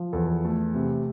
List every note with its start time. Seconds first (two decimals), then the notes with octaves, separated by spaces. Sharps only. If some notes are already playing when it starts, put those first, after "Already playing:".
Already playing: F3
0.13 E2 A4
0.45 A3
0.74 C3